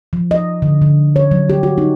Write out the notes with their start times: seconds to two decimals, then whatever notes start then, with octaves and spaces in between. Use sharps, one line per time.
0.13 F3
0.31 D#5
0.62 D3
0.82 D3
1.16 C#5
1.31 F#3
1.50 G4
1.63 F#4
1.78 D#4